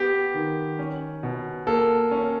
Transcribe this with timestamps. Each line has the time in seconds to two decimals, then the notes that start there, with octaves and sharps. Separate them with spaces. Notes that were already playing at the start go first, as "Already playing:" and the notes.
Already playing: B3 G4
0.34 D#3
0.79 C#4
1.23 B2
1.67 A#3 A4
2.11 C#4